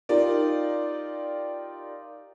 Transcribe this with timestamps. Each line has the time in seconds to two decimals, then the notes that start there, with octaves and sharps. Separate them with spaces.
0.09 D#4 F4 G4 A#4 D5